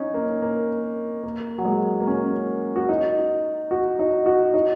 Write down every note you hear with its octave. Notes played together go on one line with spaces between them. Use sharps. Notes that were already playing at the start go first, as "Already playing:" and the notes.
Already playing: C#4 D#4
A#3
A#3
A#3
F#3
G#3
A#3
C#4
F#4
D#4
F#4
D#4
F#4
D#4